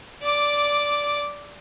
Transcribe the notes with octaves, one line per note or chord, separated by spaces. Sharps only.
D5 D6